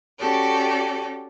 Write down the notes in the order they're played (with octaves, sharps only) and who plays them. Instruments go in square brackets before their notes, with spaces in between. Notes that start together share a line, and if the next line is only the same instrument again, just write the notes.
[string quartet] C#4 F#4 G4 A4 D5